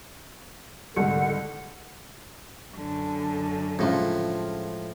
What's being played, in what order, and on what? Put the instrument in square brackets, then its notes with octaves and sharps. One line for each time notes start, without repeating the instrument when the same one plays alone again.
[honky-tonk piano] C2 G#2 [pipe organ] D3 F#5
[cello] F#2 D3
[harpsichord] A2 F3 [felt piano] C#3 F4 [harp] G#3 F#5